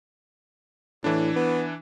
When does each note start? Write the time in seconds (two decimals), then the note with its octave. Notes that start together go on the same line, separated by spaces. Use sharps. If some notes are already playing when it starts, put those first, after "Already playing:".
1.04 A2 E3 D4
1.36 B3